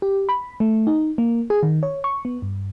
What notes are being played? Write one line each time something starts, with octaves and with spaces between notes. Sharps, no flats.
G4
B5
A3
D#4
A#3
G#4
D#3
C#5
C#6
B3
G2